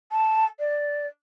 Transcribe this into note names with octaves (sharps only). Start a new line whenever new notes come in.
A5
D5